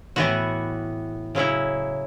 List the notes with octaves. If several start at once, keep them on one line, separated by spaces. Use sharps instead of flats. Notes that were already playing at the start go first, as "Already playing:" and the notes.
A2 E3 B3 F#4
C#3 F#3 C#4 E4